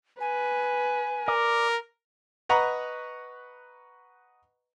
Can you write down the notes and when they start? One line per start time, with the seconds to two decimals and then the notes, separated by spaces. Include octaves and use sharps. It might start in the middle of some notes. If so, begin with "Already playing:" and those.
0.20 B4 G#5
1.28 A#4 D5
2.49 B4 D#5 F#5 A#5 B5 C#6